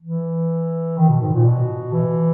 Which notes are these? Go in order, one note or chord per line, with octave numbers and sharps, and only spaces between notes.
E3
D#3
B2
G#2
A#2
B2
E3